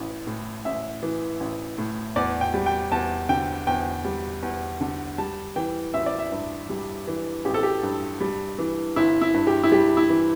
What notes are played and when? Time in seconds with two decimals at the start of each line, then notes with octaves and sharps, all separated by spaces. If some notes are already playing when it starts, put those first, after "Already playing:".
Already playing: A1 E3
0.27 A2
0.65 A1 E5
1.03 E3
1.40 A1
1.78 A2
2.16 E2 D5
2.41 G5
2.54 G3
2.66 G5
2.92 E2 A5
3.29 D3 G5
3.67 E2 G5
4.05 G3
4.43 E2
4.81 D3
5.18 G3 A5
5.56 E3 G5
5.94 A1 E5
6.06 D5
6.19 E5
6.32 G2
6.69 G3
7.07 E3
7.45 A1 G4
7.54 A4
7.63 G4
7.83 G2
8.21 G3
8.58 E3
8.96 G1 E4
9.21 E4
9.34 G2
9.47 G4
9.63 E4
9.72 G3 G4
9.97 E4
10.10 E3